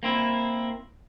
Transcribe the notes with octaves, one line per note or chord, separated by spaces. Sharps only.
A#3 C4 E4